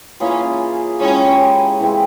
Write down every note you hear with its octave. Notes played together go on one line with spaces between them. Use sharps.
E3 A#3 C#4 F4 G#4
G#3 C#4 E4 G4
E3 G#3 C4